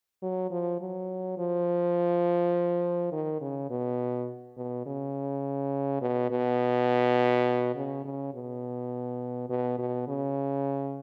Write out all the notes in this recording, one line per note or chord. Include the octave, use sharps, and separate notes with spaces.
F#3
F3
F#3
F3
D#3
C#3
B2
B2
C#3
B2
B2
C#3
C#3
B2
B2
B2
C#3